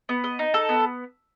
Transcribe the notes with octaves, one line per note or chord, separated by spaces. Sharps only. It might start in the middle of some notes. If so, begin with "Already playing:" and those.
B3
D#5
D#4
A4
B3